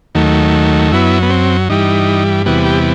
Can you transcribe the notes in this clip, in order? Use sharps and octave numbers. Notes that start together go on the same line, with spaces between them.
D#2 D#3 F#3 A3
F#2 F#3 B3 E4
B3
C4
G2 E3 G3 D#4
E2 C3 E3 G3 B3 F#4
G4